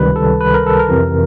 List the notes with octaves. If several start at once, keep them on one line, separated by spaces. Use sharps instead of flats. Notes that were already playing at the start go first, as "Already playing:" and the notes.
Already playing: C#2 C3 D#3 G3 B4
A4
B4
A#4
A4
A#4
F2 C3 E3